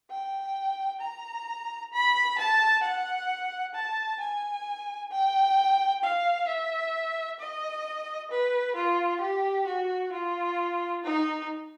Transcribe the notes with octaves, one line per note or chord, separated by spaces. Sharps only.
G5
A#5
B5
A5
F#5
A5
G#5
G5
F5
E5
D#5
B4
F4
G4
F#4
F4
D#4